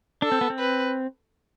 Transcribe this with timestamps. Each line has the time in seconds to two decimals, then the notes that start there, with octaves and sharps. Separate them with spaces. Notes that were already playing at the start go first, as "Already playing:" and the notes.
0.22 D4 A4
0.32 C4
0.41 B3
0.50 C4
0.59 B4